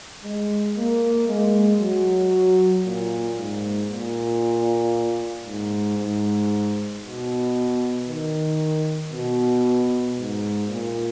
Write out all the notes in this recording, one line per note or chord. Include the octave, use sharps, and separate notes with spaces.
G#3
A#3
G#3
F#3
A#2
G#2
A#2
G#2
G#2
B2
D#3
B2
G#2
A#2